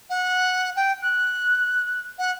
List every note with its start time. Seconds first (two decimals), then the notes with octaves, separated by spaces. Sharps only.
0.10 F#5
0.76 G5
1.02 F#6
2.18 F#5